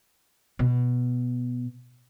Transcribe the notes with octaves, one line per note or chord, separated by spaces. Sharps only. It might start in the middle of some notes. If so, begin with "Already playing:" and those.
B2